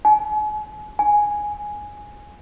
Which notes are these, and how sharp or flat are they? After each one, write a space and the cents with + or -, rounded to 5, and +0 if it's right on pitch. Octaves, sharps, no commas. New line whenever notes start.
G#5 +40
G#5 +0